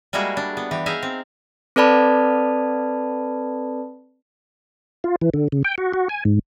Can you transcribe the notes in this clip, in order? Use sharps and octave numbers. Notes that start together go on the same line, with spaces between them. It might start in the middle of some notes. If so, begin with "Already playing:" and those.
G3 G#3 A#3 E4 F#4 G#4
D4
B3
E3 G4
D#4 G#4 E5 F5
C4
C4 A4 B4 D5 A5 B5
F4
E3
D3
C#3
G5
F#4
F#4
G#5
G#2